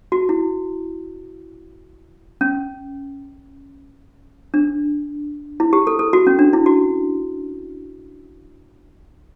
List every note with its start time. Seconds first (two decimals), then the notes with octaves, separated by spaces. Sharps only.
0.12 F#4
0.29 E4
2.41 C#4
4.54 D4
5.60 E4
5.73 G4
5.87 A4
5.99 A4
6.13 F#4
6.27 C#4
6.39 D4
6.53 E4
6.66 F#4